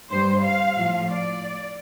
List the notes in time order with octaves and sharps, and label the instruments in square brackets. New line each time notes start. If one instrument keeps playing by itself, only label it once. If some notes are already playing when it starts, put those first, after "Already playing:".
[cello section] G2 G3 C5
F5
A2 F3
D5